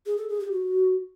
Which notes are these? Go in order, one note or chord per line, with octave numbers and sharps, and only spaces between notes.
G#4
A4
G#4
G4
F#4